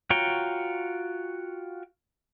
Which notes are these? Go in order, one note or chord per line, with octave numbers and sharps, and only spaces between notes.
F4 F#4 C#5 G5 A#5